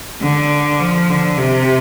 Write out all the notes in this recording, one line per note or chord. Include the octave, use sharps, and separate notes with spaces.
D3
F3
D3
C3